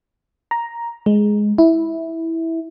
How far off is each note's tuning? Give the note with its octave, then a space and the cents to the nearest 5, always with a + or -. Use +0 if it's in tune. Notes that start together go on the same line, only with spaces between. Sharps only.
A#5 +5
G#3 +5
E4 -10